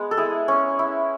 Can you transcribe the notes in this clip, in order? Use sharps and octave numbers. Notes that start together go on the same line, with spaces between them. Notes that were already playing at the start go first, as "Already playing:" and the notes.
Already playing: G#3 B3
A4
E4 G#4
C#4
E4